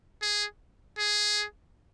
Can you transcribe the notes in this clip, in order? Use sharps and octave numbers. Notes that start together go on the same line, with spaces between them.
G#4
G#4